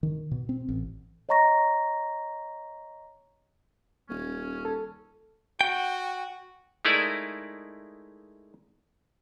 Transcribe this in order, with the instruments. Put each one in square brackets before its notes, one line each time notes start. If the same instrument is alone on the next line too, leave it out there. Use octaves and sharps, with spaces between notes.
[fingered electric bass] D#3
B2
C4
A1
[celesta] C#5 D#5 A#5 C#6 A#6
[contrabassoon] D#1 [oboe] C#4
[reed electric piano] A4
[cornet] F#4 [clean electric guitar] G5
[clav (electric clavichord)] G#3 A3 D#4 E4 A#4 D5